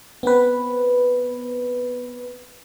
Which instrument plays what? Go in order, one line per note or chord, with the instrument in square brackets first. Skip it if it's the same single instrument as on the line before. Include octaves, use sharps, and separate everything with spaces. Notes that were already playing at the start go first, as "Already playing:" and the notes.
[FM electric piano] B3 C4 B4